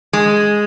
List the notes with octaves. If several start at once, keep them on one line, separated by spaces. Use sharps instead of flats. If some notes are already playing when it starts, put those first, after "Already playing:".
G#3